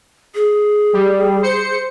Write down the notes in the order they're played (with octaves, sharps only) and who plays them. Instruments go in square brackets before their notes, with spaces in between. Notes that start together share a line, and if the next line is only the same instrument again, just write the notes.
[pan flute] G#4
[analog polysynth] G3
C5 C#7